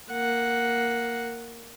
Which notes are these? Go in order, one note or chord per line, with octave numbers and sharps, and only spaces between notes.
A#3 F#5